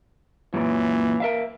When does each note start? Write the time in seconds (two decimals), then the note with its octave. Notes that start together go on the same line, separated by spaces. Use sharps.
0.54 F#2 A#2 E3
1.20 A#4 E5 F5